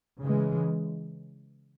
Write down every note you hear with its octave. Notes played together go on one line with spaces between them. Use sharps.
C#3 E3 G#3